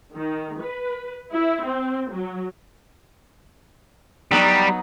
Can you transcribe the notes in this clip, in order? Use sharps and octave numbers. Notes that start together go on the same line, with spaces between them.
D#3
B4
E4
C4
F#3
F#3 G3 B3 D#4